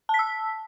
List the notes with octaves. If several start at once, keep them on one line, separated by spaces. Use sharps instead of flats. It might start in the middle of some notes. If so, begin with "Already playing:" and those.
A5 E6 B6